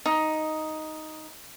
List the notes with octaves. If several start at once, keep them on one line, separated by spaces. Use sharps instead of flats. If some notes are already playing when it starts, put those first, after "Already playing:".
D#4